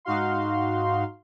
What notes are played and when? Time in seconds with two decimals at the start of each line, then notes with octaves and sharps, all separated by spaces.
0.05 G#2 D#4 F#4 F5 C6